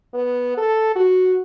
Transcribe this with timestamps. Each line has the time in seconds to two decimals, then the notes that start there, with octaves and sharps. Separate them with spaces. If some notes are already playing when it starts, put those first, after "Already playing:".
0.14 B3
0.57 A4
0.95 F#4